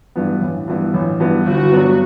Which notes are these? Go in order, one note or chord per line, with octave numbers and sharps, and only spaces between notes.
G2 E3 B3
A1
G2 E3 B3
A1
G2 E3 B3
G1 F#4
G2 F#3 B3